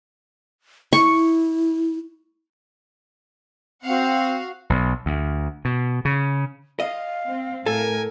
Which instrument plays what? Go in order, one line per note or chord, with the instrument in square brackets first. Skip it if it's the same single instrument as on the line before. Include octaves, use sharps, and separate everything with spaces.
[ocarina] E4 [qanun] C#6
[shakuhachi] C4 [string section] F#4 F5 F#5
[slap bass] B1
D2
B2
C#3
[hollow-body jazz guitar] D#5 [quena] F5
[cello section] C4
[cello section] A2 A#4 [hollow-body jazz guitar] A4 [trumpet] G#5